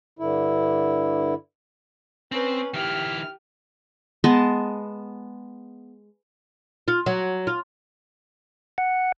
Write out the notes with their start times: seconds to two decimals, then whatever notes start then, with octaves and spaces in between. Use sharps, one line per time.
0.19 G2 D3 E4
2.32 C4 C#4 B4
2.74 D#3 E4 G4 F6
4.24 G#3 B3 D#5 A5
6.88 F4
7.06 F#3
7.47 F4
8.78 F#5